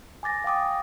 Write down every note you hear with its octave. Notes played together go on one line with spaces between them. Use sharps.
G#5 D6 A6 A#6
F5 G5 D6 D#6